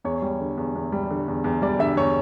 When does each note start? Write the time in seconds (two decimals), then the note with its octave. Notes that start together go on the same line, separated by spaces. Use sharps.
0.04 E2 C#5
0.22 G3
0.40 D3
0.57 E2
0.75 E2
0.92 G3
1.10 D3
1.28 E2
1.44 E2
1.62 G3 D5
1.79 D3 E5
1.97 E2 C#5